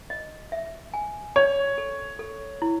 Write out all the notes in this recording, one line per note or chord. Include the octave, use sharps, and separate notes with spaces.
D#5
E5
G#5
C#5 D5
A4
A4
E4